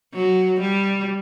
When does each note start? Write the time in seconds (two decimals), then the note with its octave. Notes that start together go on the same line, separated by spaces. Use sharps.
0.14 F#3
0.61 G3